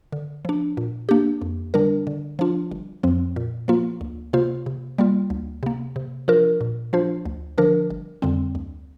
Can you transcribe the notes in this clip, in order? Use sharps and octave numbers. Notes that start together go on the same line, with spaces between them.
D3
F3 D4
A#2
A#3 D4 G4
F2
D3 G3 D4 A#4
D3
F3 D4 F4
G1
F2 F3 C4
A#2
F3 A#3 F4
D2
C3 A#3 F4 C5
C3
G3 A#3 F4
D2
C3 A#3
C3
F3 D4 F4 A#4
A#2
F3 D4 F4 C5
D2
D3 F3 D4 A#4
G1
F2 D3 G3 C4
D2